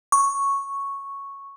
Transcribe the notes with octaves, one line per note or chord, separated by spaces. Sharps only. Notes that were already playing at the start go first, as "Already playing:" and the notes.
C#6